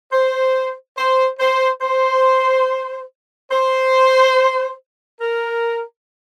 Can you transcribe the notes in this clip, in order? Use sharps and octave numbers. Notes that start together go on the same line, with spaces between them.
C5
C5
C5
C5
C5
A#4